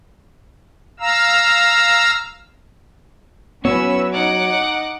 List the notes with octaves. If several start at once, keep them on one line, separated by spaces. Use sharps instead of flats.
F5 A#5 E6
F#3 B3 C#4 E4 B4 C#5 E6
D#4 F#5 D6